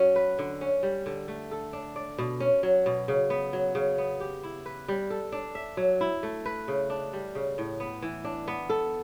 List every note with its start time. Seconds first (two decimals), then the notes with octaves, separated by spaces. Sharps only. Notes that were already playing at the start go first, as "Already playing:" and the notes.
Already playing: F#3 C#4 F#4
0.16 B4
0.39 D3
0.61 C#4
0.83 G3
1.06 D3
1.28 A3
1.51 A4
1.73 D4
1.96 D5
2.19 B2
2.40 C#4
2.63 F#3
2.86 B2
3.08 C#3
3.30 B3
3.53 F#3
3.75 C#3
3.98 B3
4.20 G4
4.43 E4
4.66 B4
4.88 G3
5.10 A4
5.32 D4
5.55 E5
5.77 F#3
6.01 E4
6.23 A3
6.46 B4
6.68 C#3
6.90 D4
7.13 G3
7.35 C#3
7.58 A2
7.80 B3
8.02 E3
8.25 D4
8.48 B3
8.70 A4